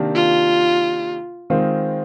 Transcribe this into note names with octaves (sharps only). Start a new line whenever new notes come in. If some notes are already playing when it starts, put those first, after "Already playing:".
Already playing: C3 D#3 A#3 D4
F4
D#3 G#3 C4 F4